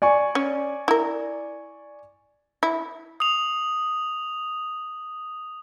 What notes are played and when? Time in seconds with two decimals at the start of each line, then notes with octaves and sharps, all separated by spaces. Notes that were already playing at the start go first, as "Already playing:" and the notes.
0.02 D5 G#5 C#6
0.35 C#4
0.88 E4 A#4
2.63 E4
3.20 D#6 F7